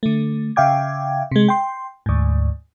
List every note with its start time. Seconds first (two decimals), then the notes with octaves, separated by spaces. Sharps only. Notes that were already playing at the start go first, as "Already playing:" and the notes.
0.03 D3 A3
0.56 C#3 E5 F5 G5 D6 G#6
1.31 C3 G#3
1.48 G5 C6
2.06 D2 G#2